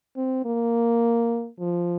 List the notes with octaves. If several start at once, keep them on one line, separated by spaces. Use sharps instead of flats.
C4
A#3
F3